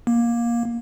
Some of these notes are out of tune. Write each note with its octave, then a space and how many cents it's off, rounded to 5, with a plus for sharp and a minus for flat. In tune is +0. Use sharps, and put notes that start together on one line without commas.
A#3 +15